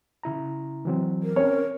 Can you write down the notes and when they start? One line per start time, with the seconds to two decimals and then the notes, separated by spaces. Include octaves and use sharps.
0.23 C#3 E4 A#5
0.85 E3 F#3 C4
1.23 A#4
1.36 C4 C#4 C#5